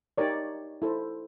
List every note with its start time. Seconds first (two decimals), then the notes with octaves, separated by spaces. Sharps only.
0.18 D#4 G4 A#4 C#5 D5
0.82 E4 A4 C5